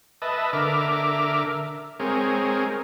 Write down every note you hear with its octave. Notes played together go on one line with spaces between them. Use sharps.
B4 D#5 E5 A5
D3 A#4 E5 D6 F6
G#3 C4 G#4 A#4 C#5